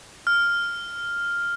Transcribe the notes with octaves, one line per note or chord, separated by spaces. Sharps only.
F6